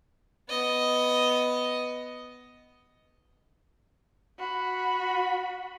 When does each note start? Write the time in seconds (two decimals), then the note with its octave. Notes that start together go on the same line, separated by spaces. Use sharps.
0.49 B3 D#5
4.39 F#4 B5